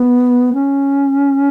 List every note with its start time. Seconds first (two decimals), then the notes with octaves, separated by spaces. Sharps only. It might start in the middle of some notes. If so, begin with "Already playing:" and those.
Already playing: B3
0.53 C#4